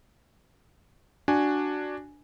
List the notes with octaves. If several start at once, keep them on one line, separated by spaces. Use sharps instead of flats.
D4 F#4 G#5